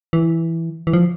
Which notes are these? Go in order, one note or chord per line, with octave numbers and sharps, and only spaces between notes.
E3
E3
F3